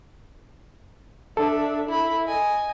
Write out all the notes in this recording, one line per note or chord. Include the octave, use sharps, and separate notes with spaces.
D4 A4 E5
E4 B5
D#5 G#5